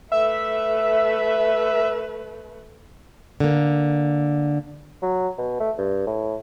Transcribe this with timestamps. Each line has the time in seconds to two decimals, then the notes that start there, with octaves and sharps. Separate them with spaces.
0.12 A3 B4 E5
3.40 D3 A#3
5.02 F#3
5.38 B2
5.60 A3
5.78 G2
6.07 A2